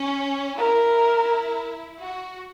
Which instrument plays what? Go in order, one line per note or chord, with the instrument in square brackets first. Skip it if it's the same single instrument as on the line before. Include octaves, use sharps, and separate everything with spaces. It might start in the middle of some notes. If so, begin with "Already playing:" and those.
Already playing: [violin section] C#4
[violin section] E4 [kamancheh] A#4
[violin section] F#4